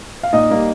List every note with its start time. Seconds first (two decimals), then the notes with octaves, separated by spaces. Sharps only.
0.23 F5
0.33 A#2 D#4 D#5
0.50 G3 A#3